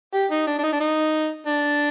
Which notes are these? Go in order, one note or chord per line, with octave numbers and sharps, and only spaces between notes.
G4
D#4
D4
D4
D#4
D4
D#4
D4